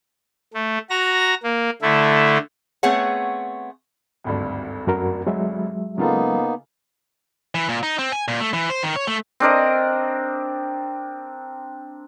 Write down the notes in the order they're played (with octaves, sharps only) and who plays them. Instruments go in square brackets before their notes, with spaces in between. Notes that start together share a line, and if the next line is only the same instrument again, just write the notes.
[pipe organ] A3
F#4 A#5 A#6
A#3
D3 A3 E4
[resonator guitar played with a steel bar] A3 B3 C4 G#4 C#5 F#5
[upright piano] G#1 D2 G2
[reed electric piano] F#2 F#4 A#4
F#3 G#3 E5
[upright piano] C#3 F4 A4 [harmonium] A#3 B3 D#4
[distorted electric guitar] E3
A#2
D#4
C4
G#5
A#2
A3
E3
C5
D#3
C#5
A3
[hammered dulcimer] C4 D4 A#4 D#5